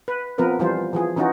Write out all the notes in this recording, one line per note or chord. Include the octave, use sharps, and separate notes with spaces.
B4
F3 B3 C4 A#4 B4
E3 F3 G3 F4 C5
E3 F3 G#4
E3 C#4 D#4 F4 F#4